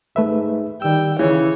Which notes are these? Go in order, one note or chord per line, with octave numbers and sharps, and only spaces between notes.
G#2 A3 B4 E5
D#3 G3 G5 E6
C#3 E3 C#5